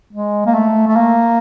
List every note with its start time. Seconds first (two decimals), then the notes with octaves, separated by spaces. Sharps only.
0.13 G#3
0.46 A#3
0.54 A3
0.88 A3
0.96 A#3